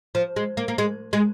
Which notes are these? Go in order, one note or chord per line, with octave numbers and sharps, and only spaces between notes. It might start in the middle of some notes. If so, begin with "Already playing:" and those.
F3
G#3
A#3
A#3
G#3
G#3